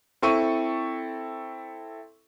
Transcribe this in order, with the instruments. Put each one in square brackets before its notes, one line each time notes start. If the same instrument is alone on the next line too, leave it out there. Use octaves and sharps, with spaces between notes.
[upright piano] C4 E4 A4 C#6 D#7